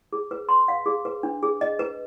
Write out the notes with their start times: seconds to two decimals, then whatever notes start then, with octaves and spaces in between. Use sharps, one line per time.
0.13 G#4
0.31 B4
0.49 C6
0.68 F5
0.86 G#4
1.05 B4
1.23 D4
1.43 G#4
1.61 D#5
1.79 B4